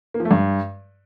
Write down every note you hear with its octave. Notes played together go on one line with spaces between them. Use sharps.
A#3
F3
A3
G2